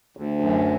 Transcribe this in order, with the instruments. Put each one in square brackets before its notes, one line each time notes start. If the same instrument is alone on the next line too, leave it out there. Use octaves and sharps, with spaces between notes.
[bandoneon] D2
F#2